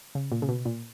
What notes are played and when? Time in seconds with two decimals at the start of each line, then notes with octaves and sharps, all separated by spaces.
0.15 C#3
0.32 A#2
0.42 C#3
0.49 B2
0.65 A#2